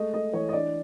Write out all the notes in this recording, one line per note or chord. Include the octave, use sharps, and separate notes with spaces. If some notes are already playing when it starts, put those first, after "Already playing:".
Already playing: G#3 A3 D#5
A3 D#5
E3 C#5
D#5
D4 D5